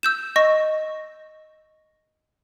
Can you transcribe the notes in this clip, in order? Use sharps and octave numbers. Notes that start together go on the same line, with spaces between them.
E6 G6 E7
D#5 C#6 A#6